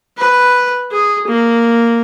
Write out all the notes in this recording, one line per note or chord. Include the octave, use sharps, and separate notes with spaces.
B4
G#4
A#3